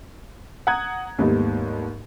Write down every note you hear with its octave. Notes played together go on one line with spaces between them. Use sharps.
F#5 A#5 D#6 F#6 G#6
D#2 G#2 G3 A3 B3 D#4